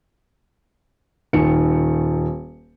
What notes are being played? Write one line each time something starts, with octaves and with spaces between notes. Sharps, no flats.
D#1 D#3 C#7